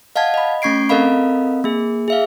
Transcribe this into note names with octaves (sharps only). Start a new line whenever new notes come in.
D#5 F5 F#5 A5 G#6
D#5 B5
A3 C#4 C#6 G#6 C7 D7
C4 A4 A#4 D#5 F5 B5
A#3 G#4
G#4 E5 F5